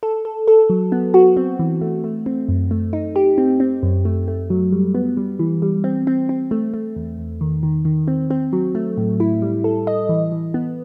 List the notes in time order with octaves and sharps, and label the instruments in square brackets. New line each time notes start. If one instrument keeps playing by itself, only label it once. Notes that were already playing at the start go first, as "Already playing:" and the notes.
[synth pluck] A4
A4
A4
F#3
B3
F#4
C4
E3
A3
A3
C4
F#2
A3
D#4
G4
C4
C4
F#2
A3
A3
F#3
G3
B3
G3
E3
G3
C4
C4
C4
A3
A3
E2
E2
D#3
D#3
D#3
C4
C4
F#3
A3
A2
E4
G3
A4
D#5
E3
E3
B3